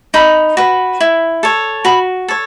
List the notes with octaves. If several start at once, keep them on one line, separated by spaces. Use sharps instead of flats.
D#4 B5
F#4 B4
E4
A4 C#5
F#4 B5
A4 C#5